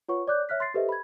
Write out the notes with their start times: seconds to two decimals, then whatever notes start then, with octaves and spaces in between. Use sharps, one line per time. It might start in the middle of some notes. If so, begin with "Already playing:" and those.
0.09 F4 B4 C#5 F#5 C#6
0.27 C#5 D5 D6 F#6 G6
0.49 C#5 E5 F6 F#6 B6
0.60 C6 A6 C7
0.74 G4 A4 B4 C5 D#5 E5
0.89 B5 G#6